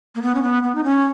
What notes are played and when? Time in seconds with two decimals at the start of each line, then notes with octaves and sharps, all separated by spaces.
0.15 A#3
0.22 B3
0.35 C#4
0.43 B3
0.63 B3
0.75 D#4
0.84 C#4